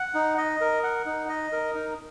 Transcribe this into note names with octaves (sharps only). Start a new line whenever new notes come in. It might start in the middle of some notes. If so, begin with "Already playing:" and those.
Already playing: F#5
D#4
D#5
A#4
F#5
D#4
D#5
A#4
D#4